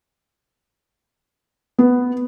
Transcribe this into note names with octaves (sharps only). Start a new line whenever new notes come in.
B3